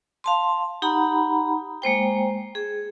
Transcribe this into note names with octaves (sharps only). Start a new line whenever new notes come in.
F5 A5 C6
D#4 G4 F#5 A#5 B5
G#3 A#3 C5 G5
G#4